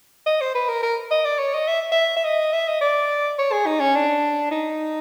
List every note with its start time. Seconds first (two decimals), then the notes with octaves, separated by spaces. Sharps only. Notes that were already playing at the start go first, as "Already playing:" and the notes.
0.26 D#5
0.41 C5
0.54 B4
0.68 A#4
0.83 A#4
1.11 D#5
1.25 D5
1.39 C#5
1.54 D#5
1.67 E5
1.92 E5
2.16 E5
2.24 D#5
2.53 E5
2.68 D#5
2.81 D5
3.38 C#5
3.52 G#4
3.66 D#4
3.80 C#4
3.95 D4
4.51 D#4